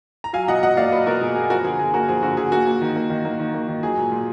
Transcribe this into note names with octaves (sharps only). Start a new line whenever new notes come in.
A#5
F#3 F5 G#5
B2 D#5 F#5
B2 D#5 F#5
A#3 D5 F5
F#3 B4 D#5
B2 F#4 A#4
B2 G#4
A#3 G#4
F3 F#4 A#4
D3 G#4
D3 G#4
A#3 F#4 A#4
F3 G#4
D3 F#4
D3 G#4
A#3 F#4
A#3
D#3
A#3
D#3
A#3
D#3
A#3
D#3
F#3 G#4
A#2
A#2